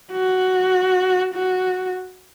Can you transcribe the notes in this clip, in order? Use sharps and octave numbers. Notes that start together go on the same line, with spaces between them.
F#4
F#4